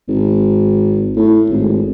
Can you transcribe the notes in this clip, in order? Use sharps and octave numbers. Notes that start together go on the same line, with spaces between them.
G#1
A2
G#1